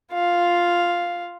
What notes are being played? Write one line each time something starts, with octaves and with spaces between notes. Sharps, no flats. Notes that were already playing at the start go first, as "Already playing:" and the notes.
F4 F5